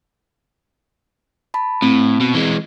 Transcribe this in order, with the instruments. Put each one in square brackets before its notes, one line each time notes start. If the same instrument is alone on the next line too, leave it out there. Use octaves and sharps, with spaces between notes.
[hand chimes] A5 B5
[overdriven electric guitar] A2 [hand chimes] C4
[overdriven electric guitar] B2
E3 G#3